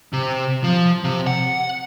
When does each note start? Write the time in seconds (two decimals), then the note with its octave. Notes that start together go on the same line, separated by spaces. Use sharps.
0.13 C3
0.64 F3
1.04 C3
1.27 F#5